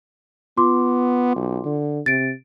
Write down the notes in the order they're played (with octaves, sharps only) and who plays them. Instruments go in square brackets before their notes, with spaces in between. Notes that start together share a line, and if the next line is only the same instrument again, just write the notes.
[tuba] B3 [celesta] F4 C6 D6
[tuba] B1
D3
[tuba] C3 [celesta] A6 D7